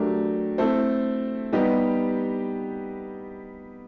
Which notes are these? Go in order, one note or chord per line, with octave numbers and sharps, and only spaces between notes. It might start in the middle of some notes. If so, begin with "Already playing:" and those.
Already playing: F#3 A3 D4 G4 A#4
A3 C4 E4 A4
G3 B3 D#4 G4